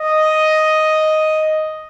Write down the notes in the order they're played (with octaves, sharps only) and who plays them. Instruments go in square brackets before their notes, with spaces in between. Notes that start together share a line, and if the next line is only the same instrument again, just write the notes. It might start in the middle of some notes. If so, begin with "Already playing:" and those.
Already playing: [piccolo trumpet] D#5